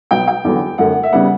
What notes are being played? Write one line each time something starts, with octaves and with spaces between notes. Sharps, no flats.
B2 F#3 B3 G5
G5
E2 D3 F#3 B3
F#2 D3 A3 F#5
E5
C#3 G3 B3 F#5